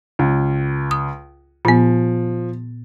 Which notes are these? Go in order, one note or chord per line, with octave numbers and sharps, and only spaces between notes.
C#2
D#6
A#2 F3 B3